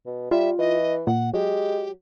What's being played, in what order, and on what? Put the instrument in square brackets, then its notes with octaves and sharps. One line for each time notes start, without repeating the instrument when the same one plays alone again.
[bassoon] B2
[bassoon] G3 [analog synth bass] F4 [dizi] E5
[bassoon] E3 [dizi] D#5
[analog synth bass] A#2 [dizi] F#5
[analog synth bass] F#3 [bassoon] G#3 [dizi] G4